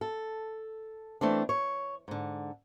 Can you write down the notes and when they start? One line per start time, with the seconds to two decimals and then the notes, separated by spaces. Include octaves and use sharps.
0.01 A4
1.21 E3 A3 C4 D4
1.49 C#5
2.08 G#2 D3